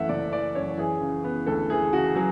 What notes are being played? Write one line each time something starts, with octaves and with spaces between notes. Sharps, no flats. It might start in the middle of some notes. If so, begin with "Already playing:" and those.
Already playing: F#2 E3 A3 E5 F#5
F#1 D5
E3 D5
F#2 C#5
E3 G#4
C#3
B3
D2 A4
E3 G#4
C#3 F#4
F#3 G#4